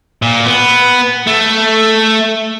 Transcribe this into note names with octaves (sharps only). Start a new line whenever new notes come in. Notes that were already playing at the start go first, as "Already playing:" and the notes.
A#2
B3
A3